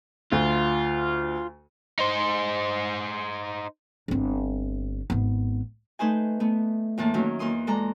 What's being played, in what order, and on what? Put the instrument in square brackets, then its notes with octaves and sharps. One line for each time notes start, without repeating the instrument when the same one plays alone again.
[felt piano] D2 [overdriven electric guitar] F4
[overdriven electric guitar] D#4 C5
[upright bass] G1 C4
G#1 B3
[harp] A3 D#4 B4 C5 G#5
A3 B3
E2 A2 E3 A#3 A5
D#3 F#3 A#3 C#4
E2 A#3 C6 D#6
G#3 A4 D5 A#5